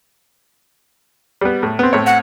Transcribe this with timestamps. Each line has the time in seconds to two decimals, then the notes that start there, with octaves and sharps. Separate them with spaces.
1.41 G3 B3
1.63 A2
1.79 B3 C4
1.93 A2 C4 C#5
2.06 F#5